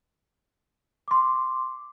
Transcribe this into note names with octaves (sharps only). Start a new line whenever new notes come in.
C6 D6